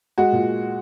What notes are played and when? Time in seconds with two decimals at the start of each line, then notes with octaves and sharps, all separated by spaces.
0.18 G#3 F#4
0.33 A#2